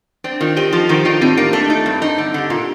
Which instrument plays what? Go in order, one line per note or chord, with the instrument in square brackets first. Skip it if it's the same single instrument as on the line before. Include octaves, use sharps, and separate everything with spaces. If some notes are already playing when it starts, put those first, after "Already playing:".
[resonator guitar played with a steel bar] C4 [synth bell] D4
[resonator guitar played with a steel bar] D#3 [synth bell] D4 F4
[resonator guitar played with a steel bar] C4 [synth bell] D#4 G4
[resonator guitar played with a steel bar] F3 [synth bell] F4 A4
[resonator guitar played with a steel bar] D#3 [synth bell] D#4 G4
[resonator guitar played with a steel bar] D#3 [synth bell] D4 F4
[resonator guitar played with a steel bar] A2 [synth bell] C4 D#4
[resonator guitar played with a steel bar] A#3 [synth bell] D4
[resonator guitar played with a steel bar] A3 [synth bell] D4
[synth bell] D4 [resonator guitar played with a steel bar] D#4
[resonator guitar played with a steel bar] G2 [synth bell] C4
[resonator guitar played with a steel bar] D#4
[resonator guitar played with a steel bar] D3 [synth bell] D4
[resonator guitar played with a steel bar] D3 [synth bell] G4
[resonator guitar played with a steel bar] A#2 [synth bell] D4 F4